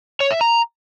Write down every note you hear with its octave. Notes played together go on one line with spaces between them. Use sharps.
C#5
E5
A#5